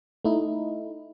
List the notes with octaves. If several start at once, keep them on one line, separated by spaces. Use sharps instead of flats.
A3 D#4 E4